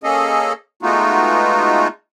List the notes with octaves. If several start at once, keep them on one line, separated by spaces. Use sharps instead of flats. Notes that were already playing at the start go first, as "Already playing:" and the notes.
A#3 C#4 G#4 A4 D#5
G#3 A3 B3 D#4 F4 F#4